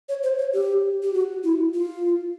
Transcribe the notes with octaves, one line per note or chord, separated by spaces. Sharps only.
C#5
C5
C#5
G4
G4
F#4
E4
F4